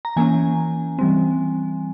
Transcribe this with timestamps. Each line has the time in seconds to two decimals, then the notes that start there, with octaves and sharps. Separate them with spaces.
0.05 A#5
0.16 E3 A#3 C#4 G#5
0.99 E3 G3 C4